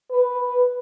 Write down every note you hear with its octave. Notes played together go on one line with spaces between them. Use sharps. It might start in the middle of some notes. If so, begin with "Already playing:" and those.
B4